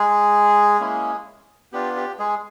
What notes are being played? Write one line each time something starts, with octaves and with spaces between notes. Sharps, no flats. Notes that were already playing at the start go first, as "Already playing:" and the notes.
Already playing: G#3 G#4
A#3 C#4 E4
B3 D4 F4 G4
G4
G#3 G#4